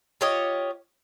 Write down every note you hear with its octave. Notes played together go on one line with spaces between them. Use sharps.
F4 G4 C#5 D#5